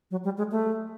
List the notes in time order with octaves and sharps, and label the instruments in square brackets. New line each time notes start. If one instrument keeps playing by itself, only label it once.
[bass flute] F#3
G3
G#3
A3